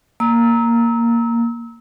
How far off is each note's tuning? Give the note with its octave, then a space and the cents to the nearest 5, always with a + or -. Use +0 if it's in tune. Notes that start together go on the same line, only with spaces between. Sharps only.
A#3 +0 E6 -30